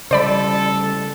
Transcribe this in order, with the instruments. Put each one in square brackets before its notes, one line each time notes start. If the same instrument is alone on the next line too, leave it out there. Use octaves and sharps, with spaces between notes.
[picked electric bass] C#3 G3 [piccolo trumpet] A4 [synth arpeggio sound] C5 D5 B5